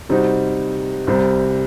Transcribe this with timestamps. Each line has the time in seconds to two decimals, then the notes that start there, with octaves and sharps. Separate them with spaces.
0.09 C3 G3 C4 D#4 F#4
1.07 C2 C3 G3 C4